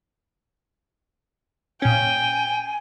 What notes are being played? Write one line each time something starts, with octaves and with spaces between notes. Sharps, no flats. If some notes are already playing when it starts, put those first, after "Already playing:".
A#2 C#4 G5 G#5